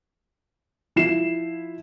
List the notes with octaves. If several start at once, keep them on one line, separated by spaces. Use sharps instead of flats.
F3 E4 C7 E7